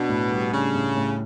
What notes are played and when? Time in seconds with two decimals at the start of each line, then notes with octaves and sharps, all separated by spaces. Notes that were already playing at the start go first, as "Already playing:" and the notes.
Already playing: B2 D4
0.09 A2
0.32 G3
0.53 C#3 D4
0.75 A2
0.97 A2